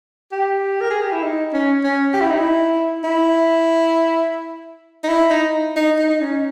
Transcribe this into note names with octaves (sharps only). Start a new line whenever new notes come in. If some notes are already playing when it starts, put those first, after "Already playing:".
G4
A#4
G#4
G4
E4
D#4
C#4
C#4
G4
E4
D#4
E4
E4
D#4
E4
D#4
D#4
D#4
D#4
C#4